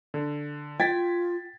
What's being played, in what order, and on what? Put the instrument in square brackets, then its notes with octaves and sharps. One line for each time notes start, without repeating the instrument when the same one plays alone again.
[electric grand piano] D3
[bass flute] F4 [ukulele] G5 [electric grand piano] G#6 A6 B6